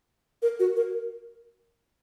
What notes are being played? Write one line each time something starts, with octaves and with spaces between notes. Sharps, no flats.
A#4
F#4
A#4